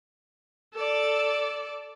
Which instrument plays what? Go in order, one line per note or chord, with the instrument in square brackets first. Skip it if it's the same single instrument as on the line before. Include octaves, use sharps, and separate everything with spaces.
[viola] A4 D5